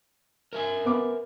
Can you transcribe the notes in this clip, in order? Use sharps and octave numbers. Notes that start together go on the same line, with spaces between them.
A#4 E5 G#5
B3 D6